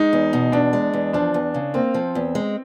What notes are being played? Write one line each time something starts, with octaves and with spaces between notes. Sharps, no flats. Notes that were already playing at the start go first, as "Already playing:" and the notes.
Already playing: G#3 D#4
E2
B2
E2 D4
G#3
E2
F3 D4
E2
C#3
A#3 C4
F3
E2
G#3